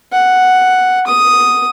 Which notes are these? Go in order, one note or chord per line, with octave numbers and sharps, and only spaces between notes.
F#5
D#6